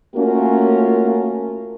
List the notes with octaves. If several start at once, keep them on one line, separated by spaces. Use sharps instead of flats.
A3 A#3 C#4 F4 F#4 A#4